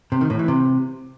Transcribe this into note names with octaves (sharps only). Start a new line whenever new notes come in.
C3
D#3
A2
E3
C3